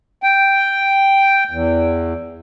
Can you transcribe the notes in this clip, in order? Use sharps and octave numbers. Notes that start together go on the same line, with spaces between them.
G5
E2